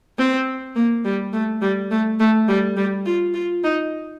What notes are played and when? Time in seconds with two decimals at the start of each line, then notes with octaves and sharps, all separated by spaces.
0.18 C4
0.76 A#3
1.05 G3
1.33 A3
1.62 G3
1.91 A3
2.20 A3
2.48 G3
2.76 G3
3.06 F4
3.34 F4
3.64 D#4